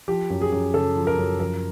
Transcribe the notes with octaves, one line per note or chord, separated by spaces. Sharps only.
F3 G4
F#2
G#4
F#2
C#3 A4
F3
A#4
F#2
F3 A#4